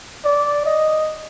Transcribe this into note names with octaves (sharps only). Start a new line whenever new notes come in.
D5
D#5